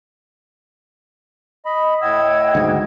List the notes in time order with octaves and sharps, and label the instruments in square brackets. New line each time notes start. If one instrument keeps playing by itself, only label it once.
[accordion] D#5 B5
[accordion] A2 D#5 E6 [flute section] F#5 G5 G#6
[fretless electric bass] D2 G#2